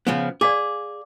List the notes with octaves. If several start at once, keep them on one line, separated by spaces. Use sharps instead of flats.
C#3 F3 B3
G#4 D5 F5 D6